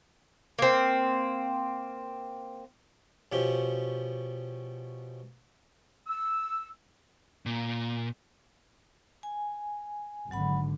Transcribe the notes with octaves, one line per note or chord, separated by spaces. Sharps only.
A#3 C4
B2 F3 C#4 G4
E6
A#2
G#5
G#1 D3 F#3 F#5 B5